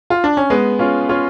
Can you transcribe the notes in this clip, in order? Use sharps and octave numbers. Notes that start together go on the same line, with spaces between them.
F4
D4
C#4
G#3 B3
C#4 F4
C#4 F4